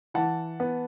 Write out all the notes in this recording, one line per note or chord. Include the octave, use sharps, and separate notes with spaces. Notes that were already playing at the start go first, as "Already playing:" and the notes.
E3 F#5 A5
B3